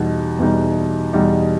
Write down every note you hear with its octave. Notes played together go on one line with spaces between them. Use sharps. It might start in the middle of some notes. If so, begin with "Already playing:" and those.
Already playing: E2 B2 G3 D#4
E2 B2 G3 D#4
E2 B2 G3 D#4